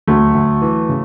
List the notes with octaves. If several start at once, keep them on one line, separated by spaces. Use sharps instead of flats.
D2 F#3 A3
D2
E3
C#3